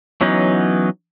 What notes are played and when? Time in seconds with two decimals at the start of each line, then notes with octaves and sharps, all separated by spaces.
0.21 E3 F#3 B3 C#4 D#4